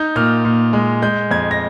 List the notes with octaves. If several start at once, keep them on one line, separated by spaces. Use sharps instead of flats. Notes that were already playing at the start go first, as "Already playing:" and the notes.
Already playing: D#4 G6
A#2 F6
A#2
G#3
G#3 G6
F2 G#6
A#6